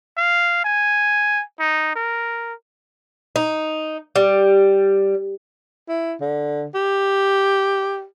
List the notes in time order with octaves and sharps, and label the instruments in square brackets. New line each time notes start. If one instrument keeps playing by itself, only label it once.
[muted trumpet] F5
G#5
D#4
A#4
[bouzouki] D#4
G3
[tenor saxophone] E4
D3
G4